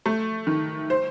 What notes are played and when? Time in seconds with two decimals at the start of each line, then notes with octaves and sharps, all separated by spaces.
0.06 A3
0.47 D#3
0.90 C5